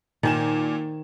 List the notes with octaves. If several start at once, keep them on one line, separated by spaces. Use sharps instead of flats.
A#2 D#3 C5 G#5 E7